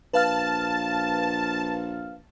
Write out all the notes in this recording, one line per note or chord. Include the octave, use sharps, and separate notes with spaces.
A#1 B4 F5 A5 F6